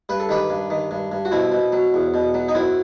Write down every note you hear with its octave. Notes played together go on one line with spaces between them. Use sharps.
G2 B4
A4
D#3 G4 B4
G2
D#3
G2
G2
F#4
B2 C4 E4
B2
F#3
E2
B2
F#3
D#4
F#2 C4 E4